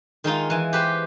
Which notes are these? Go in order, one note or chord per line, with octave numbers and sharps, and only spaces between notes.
D#3 G#3 D#4 F4
E3 G#5
G4 B4 C5